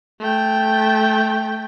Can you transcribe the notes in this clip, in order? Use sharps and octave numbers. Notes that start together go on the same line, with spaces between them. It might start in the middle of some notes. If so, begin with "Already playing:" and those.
A3 G5